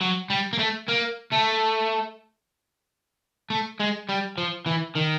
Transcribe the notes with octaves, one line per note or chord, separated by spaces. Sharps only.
F#3
G3
A#3
A3
A#3
A3
A3
G#3
G3
F3
E3
D#3